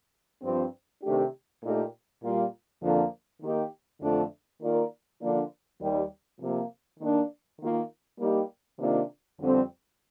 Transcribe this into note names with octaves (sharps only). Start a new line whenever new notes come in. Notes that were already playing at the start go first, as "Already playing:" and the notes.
G2 F3 C4
C3 D#3 A3 D4 G4
A#2 A3 D#4 G4 A#4
A#2 G3 A#3 F4
F2 D3 F3 A#3 D4
D#3 A#3 D#4 G4
F2 D3 F3 A3 D4
D#3 A#3 F4 A#4 D5
D3 F3 A#3 D4
D#2 D#3 G3
C3 F3 A#3
D#3 A#3 D4
D#3 A#3 F4
G3 A#3 D#4 G4
C3 D#3 A#3 D4 F4
F2 D3 G3 C4 G4